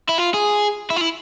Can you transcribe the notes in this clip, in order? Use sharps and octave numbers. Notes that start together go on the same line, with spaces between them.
E4
F4
G#4
E4
F4
E4